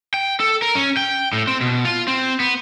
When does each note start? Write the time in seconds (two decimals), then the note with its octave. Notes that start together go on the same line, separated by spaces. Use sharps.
0.14 G5
0.40 A4
0.62 A#4
0.75 C#4
0.97 G5
1.33 A2
1.47 C4
1.61 B2
1.85 F4
2.08 C4
2.40 B3